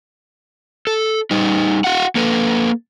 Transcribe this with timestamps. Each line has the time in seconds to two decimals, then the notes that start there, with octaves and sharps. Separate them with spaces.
0.87 A4
1.31 G3 D#4
1.84 F#4 F5 F#5
2.15 A#3 A4 B4